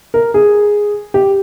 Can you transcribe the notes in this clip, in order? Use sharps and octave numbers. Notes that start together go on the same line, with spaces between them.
A#4
G#4
G4